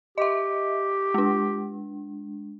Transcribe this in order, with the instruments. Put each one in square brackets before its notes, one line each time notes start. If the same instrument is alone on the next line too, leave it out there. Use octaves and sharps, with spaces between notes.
[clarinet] G4 [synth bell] D#5 E5
[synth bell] G#3 D4